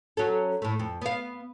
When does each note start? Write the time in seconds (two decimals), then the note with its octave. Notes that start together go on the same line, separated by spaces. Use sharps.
0.17 F#3 C#4 A4
0.62 A2 A3
0.80 F2
1.02 B3 F5